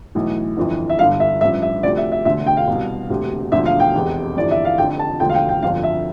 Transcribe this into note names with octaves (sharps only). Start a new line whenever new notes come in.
B1 A2 E3
G1 F2 E3
E5
G1 G2 D3 F5
E5
A1 G2 F3 E5
E5
D2 C3 F3 D5
E5
E5
E1 D2 D3 E5
G5
F5
C2 B2
E1 D2 C3
E1 D2 D3 F3 E5
F5
G5
F1 E2 C3
G1 F2 C3 E3 D5
E5
F5
F1 F2 D3 G5
A5
E1 D2 D3 F3 G5
F5
G5
G5
G1 F2 D3 F3 F5
E5